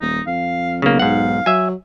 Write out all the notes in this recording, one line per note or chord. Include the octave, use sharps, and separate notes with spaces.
D#1 D#4
F2 F5
B1 C#3 A#3
G#2 F5 F#5
F#3 E5 G#5